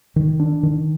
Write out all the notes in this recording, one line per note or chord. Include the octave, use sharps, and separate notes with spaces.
D#3
D4
D#3